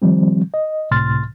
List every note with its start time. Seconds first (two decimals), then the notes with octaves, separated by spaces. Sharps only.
0.02 D#3 F3 G3 C4
0.54 D#5
0.91 C#2 A2 C3 C6 F6 A6